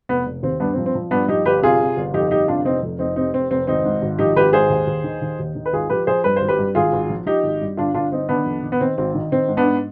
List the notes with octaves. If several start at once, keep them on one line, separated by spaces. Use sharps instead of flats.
F1 B3
F1
D#2 C4
G2 B3 D4
C4
F3
C4
F3
G2 B3 D4
F3 D#4 G4
G1 G4 B4
C3 F4 G#4
C3
G1
F2 D#4 G4
G1 D#4 G4
C3 D4 F4
F1 C4 D#4
F2
F1 C4 D#4
C3 C4 D#4
F1 C4
F1 C4
G#1 C4 D#4
G#2
G#1
F3 D#4 G4
G#1 G4 B4
G#2 G#4 C5
D#2
D#2
D#3
D#3
D#2
D#3
B4
G#1 F4 G#4
F3 G4 B4
F3 G#4 C5
G2 B4
G#1 C5
G4 B4
G2
G#1 F4 G#4
G#1
F3
F3 D#4 G4
G#1
G2
G1 D4 F4
G1 D4 F4
G1 C4 D#4
D#3 B3 D4
F2
D#3
B3
D#3 C4
G#1 C4
D#3
D#3 C4
G#2
B3 D4
G#2